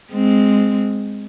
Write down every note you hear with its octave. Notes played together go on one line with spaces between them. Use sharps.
G#3 C4